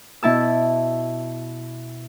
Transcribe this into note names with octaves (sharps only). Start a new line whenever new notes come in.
B2 E4 A5 E6